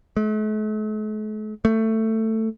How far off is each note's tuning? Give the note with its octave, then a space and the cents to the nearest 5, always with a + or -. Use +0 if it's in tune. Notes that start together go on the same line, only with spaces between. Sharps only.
A3 -45
A3 +15